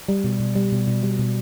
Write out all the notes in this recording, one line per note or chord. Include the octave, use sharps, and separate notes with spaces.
G3
B2
B2
G3
B2
B2
G3
B2